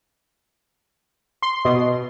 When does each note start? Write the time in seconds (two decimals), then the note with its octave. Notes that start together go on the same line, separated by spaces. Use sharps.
1.42 C6
1.65 B2